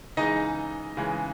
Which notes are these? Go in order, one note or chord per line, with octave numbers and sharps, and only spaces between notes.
C#3 E3 G#3 D#4 D#5
C#3 E3 G#3